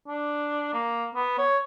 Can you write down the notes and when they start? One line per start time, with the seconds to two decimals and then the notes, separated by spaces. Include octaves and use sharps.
0.08 D4
0.74 A#3
1.15 B3
1.39 C#5